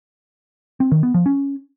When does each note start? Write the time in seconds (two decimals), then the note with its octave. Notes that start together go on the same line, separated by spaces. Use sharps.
0.80 C4
0.92 D#3
1.03 B3
1.14 F3
1.26 C#4